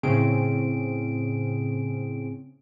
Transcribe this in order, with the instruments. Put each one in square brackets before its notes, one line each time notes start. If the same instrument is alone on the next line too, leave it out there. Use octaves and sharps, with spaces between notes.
[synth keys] A2 C#3 C4 C#4 G#4 D7